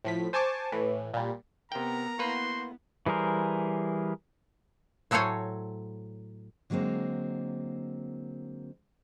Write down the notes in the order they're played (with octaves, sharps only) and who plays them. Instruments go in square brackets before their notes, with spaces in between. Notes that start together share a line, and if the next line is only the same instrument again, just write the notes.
[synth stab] A2 F3 B6
C5 G#5 A5 C#6 D6
A2 E3
A#2 G3
[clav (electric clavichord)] C3 G5 [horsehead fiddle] B3 A#4 [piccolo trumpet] A#5
[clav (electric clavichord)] A#3 B4 [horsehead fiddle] B3 E4 [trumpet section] F#4 C5 C6
[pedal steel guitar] E3 G3 G#4 A#4 C5
[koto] A2 F#3 A4 C5 C#5 G#5
[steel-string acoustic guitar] D3 F#3 G#3 A#3 C4